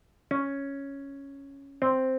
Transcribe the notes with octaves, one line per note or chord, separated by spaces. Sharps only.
C#4
C4